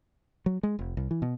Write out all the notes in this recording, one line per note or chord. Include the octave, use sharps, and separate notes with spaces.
F#3
G#3
F1
C2
E3
B2